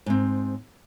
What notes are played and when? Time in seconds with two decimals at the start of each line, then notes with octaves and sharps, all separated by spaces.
0.06 G#2 C4